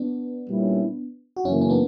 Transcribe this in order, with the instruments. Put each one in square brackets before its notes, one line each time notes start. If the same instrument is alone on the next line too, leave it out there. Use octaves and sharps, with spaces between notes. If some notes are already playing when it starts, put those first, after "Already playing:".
Already playing: [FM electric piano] B3 D4
[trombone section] A#2 G3 C#4 E4
[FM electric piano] F#4
[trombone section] F#2 C#3 E3 A#3 [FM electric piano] C#4 E4
[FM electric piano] C#4
B3 D4